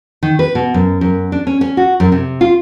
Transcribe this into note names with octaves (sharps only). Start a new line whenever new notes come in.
D#3
B4
B2
F#2
F#2
D4
C#4
C#4
F#4
F#2
C3
F4